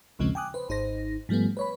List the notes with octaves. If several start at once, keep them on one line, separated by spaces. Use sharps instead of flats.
A#1 D#2 C#3 F3 G#3 C4
G5 G#5 D6 D#6 F#6
B4 C5
G#1 D#4 C5 A#6
G#2 F3 G3 A3 B3
B4 C#5 B5